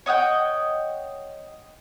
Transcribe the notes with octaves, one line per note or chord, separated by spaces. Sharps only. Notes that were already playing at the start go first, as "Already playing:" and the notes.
C#5 D#5 F#5 G5